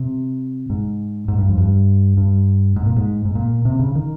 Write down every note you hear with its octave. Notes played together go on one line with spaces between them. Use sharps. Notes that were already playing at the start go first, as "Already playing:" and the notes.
Already playing: C3
G#2
G#2
G2
F2
G2
G2
G#2
A#2
G#2
G#2
A#2
C3
C#3
D#3